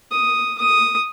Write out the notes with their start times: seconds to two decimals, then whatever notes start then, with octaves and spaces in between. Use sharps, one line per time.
0.11 D#6
0.58 D#6